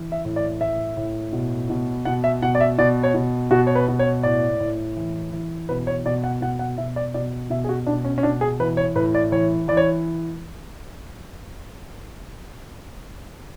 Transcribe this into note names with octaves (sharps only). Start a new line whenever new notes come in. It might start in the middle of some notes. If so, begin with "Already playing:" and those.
Already playing: E3
E5
A2
D5
A2 E5
A2
B2
B2
B2 F#5
E5
B2 F#5
D5
E5
B2 D5
C#5
B2
B2 F#4
C#5
B4
B2
C#5
A2 D5
A2
E3
E3
B2 B4
C#5
B2 D5
F#5
B2 F#5
F#5
B2 E5
D5
B2 D5
B2 E5
G#4
F#4
B2 D4
C#4
C#4
B2 D4
G#4
E3 B4
C#5
A2 B4
D5
E3 C#5
E3 D5
C#5